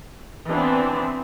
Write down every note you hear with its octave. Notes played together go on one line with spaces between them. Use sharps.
E3 B3 C4 D4 E4 B4